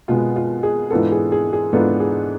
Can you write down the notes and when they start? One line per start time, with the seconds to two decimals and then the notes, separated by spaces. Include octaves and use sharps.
0.08 B2 G#3 B3 F4
0.36 F4
0.63 G#4
0.90 G#2 E3 B3 D4 F4 A4
1.12 G#4
1.32 G#4
1.53 G#4
1.73 G#2 E3 B3 D4 F4 A4
2.00 G#4